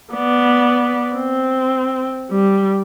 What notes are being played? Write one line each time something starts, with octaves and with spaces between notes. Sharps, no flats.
B3 D5
C4
G3